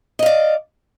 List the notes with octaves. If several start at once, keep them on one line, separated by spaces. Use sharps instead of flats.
D5 D#5 F5